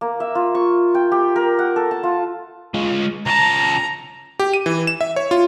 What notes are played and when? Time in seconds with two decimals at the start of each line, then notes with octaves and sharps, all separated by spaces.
0.01 A#3
0.20 E5
0.35 F4
0.55 C#6
0.95 G5
1.12 G4
1.36 A#4
1.59 F#5
1.76 A4
1.91 A5
2.03 F4
2.74 G#3 F4
3.26 C#2 A5 A#5
4.39 G4
4.54 D#7
4.66 E3
4.87 E7
5.01 E5
5.16 C#5
5.31 F4